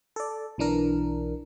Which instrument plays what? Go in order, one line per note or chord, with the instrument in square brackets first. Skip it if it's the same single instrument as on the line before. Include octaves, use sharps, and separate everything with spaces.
[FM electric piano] A4 D5
B1 E3 D4 A#4